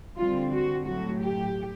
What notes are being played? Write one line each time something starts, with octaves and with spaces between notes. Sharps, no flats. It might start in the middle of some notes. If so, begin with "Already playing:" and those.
D3 G3 C4 F4
F#4
A2 F#3 A3 F#4
G4